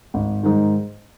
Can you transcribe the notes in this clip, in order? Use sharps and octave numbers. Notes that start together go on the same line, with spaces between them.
G#1
G#2 D#3